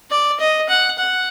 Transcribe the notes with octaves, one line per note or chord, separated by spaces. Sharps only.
D5
D#5
F#5
F#5